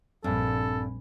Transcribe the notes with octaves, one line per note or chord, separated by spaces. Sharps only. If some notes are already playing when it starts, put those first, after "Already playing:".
A#1 G2 C4 A4 G#5 B5